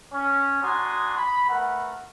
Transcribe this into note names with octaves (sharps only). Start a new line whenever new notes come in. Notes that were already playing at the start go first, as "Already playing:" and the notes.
C#4
D4 F#4 G#5 A#5 C6 D#6
B5
A3 B3 A#4 B4 F#5